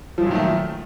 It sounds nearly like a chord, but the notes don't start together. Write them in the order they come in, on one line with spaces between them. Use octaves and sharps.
F3 F#2 A#2 D#3 A3